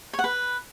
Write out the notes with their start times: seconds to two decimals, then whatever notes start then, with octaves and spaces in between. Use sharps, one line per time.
0.13 C#5
0.19 F#5
0.24 B4